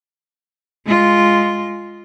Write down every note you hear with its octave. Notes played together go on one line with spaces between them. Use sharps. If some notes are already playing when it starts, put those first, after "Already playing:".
G#3 F4